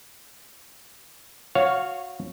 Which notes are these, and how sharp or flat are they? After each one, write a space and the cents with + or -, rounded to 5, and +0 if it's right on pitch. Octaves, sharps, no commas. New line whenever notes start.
F#4 -20 C#5 +0 F5 +0